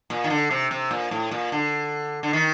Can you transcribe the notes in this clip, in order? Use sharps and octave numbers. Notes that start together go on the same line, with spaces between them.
A#2
D#3
D3
C3
C3
A#2
A2
A#2
D3
D3
D#3